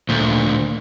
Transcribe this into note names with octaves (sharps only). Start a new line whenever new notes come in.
D2 A#2